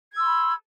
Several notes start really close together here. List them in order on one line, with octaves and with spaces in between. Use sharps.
G#6 E6 C6 B5